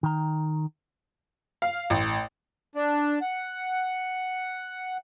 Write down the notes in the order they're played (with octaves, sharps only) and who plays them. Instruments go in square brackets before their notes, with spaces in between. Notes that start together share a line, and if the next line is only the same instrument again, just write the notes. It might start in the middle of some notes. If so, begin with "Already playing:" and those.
[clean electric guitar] D#3 A#5
[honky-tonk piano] F5
A1
[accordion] D4
F#5